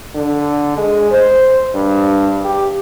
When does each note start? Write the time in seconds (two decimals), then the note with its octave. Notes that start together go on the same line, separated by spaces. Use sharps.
0.15 D3
0.77 G#3
1.11 C5
1.75 G2
2.44 G4